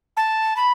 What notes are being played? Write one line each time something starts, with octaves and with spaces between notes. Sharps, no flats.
A5
B5